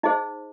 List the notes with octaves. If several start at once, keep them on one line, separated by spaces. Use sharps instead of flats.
D#4 G#4 C5 D#5